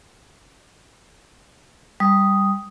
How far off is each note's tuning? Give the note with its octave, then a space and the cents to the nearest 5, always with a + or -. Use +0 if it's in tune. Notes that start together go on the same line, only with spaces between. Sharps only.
G3 +0 D#6 +0